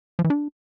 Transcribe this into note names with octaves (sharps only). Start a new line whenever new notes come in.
F3
E3
D4